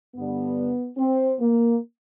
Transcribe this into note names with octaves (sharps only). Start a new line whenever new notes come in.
G2 D3 G3 B3
C4
A#3